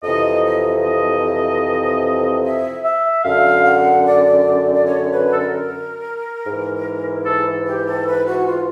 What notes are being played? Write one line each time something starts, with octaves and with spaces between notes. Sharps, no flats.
F2 C3 E3 D#5
D#5
D#5
E5
E5
F#2 D3 F5
F#5
D5
D5
C#5
B4
A4
A#4
G#2 E3
A4
G4
A4
B4
F#4
F4